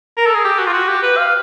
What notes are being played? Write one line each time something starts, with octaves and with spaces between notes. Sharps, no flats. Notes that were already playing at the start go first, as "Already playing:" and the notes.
A#4
A4
G#4
G4
F#4
F4
F#4
G4
B4
F5